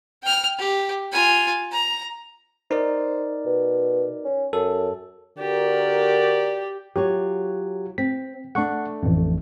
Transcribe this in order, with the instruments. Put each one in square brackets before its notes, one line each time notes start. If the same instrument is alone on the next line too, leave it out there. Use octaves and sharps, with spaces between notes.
[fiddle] G5 F6
G4
F4 G#5
A#5
[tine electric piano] D#4 A#4 D5 [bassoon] C5
[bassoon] B2
C#4
[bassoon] F#2 [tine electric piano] A4
[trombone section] D3 F#4 A#4 [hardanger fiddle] G4 [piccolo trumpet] D5
[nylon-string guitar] F#3 F4 C#5 [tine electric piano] G4
[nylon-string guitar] C4 [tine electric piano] B6
[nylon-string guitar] A3 D4 [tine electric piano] F#5 C#6
[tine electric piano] A1 F2